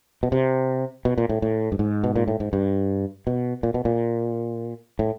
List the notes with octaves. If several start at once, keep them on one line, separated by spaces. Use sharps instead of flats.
B2
C3
B2
A#2
A2
A2
G2
G#2
B2
A#2
A2
G#2
G2
B2
A#2
B2
A#2
A2